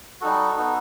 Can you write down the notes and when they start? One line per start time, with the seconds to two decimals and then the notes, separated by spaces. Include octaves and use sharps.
0.21 G3 D#4 F#4 A4
0.57 B3 D#4 F#4